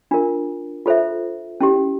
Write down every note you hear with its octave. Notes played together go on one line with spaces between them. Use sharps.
D4 F4 A#4
F4 A4 C5 E5
C#4 E4 G4